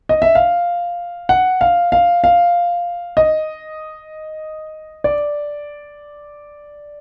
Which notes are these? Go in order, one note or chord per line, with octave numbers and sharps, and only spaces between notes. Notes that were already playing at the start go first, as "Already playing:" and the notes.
D#5
E5
F5
F#5
F5
F5
F5
D#5
D5